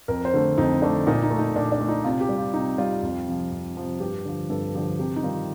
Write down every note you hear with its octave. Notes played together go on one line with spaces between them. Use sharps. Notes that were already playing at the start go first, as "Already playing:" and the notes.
F2 A#4
C5
D3 A3
F2 D#4
D3 A3 D4
A#2 D#4
D#4
A3
D#4
A#2 D4
D4
A3
D#4
C3 F4
G4
G3
F4
C3 D#4
G3 F4
F2
C3 F3
F2
C3 F3
G2 G4
D3 F3
G2 A4
D3 F3 G4
C3 G4
D#4
D#3 G3 F4